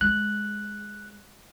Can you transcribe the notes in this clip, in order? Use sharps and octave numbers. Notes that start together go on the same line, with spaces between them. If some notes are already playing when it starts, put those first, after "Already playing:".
G#3 F#6